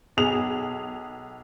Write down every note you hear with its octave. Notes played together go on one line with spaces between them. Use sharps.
B1 G#4 F7